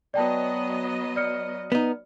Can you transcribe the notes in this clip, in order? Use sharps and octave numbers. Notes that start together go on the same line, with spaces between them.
F#3 B3 D5 D#5 G5 A5
D5 F6 C#7
B3 D#4